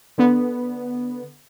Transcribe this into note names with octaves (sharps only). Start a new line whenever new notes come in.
D3 B3